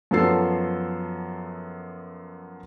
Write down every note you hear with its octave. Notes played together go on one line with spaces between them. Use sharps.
F#2 F3 B3 A4 C7